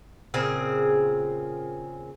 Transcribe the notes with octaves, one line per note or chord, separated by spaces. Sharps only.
A#2 C#3 C4 G#4